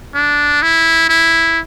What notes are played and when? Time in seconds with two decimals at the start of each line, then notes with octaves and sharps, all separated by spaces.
0.15 D4
0.62 E4
1.09 E4